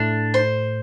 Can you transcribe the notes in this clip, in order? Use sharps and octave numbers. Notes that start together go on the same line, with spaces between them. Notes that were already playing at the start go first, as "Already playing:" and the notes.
Already playing: A2 A3 D4
C5